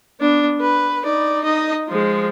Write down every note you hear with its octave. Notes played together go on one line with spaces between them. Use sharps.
B3 D4
B4
D#4 D5
D#4 D#5
F3 G#3